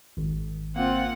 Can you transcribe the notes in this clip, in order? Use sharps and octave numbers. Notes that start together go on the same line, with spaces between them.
G#1
A#3 C4 F4 F#5